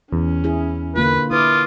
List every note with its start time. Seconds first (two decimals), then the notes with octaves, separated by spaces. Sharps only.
0.13 E2 C#4
0.44 E4 G#4
0.96 D3 A#3 F4 B4
1.31 E4 F4 B4 D6 D#6